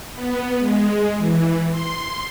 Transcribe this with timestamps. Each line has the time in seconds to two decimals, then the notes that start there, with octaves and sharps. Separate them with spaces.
0.14 B3
0.60 G#3
1.18 E3
1.70 C6